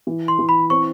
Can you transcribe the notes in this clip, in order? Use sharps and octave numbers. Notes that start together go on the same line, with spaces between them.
E3
C6
E3
B5
C4 C#6